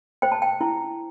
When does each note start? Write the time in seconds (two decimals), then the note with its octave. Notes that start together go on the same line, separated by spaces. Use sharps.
0.22 C5 G5
0.32 A5
0.42 G5
0.61 E4